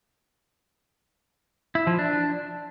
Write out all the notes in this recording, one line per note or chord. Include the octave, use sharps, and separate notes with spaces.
E4
F3
D4